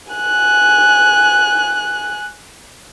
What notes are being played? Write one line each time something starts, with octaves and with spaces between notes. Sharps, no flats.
G#5 F#6